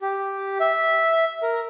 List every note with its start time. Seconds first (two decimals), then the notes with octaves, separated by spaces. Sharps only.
0.01 G4
0.60 E5
1.42 A#4